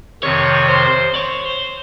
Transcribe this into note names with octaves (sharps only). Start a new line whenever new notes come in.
F2 C3 D#3 C#5
C5
C#5
C5